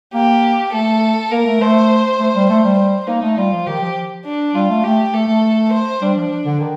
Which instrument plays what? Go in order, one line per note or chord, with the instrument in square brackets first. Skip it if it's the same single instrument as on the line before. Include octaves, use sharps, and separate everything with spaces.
[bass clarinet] A#3 [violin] G4
[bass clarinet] A3 [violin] A4
[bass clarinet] A#3 [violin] A#4
[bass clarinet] A3
[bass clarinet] A3 [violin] C5
[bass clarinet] A3
G3
[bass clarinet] A3 [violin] C5
[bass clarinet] G3
[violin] C5
[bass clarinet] A#3 [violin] D#4
[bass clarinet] A3
[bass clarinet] G3 [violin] F4
[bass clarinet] F3
[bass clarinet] D#3 [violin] G4
[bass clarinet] F3
[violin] D4
[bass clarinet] G3 [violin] F4
[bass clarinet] A3
[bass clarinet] A3 [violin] G4
[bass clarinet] A3 [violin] A4
[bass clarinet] A3
[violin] C5
[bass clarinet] G3 [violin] D4
[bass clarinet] F3
D3
D#3